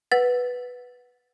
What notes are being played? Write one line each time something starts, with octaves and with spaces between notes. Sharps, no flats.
B4 F#5 A6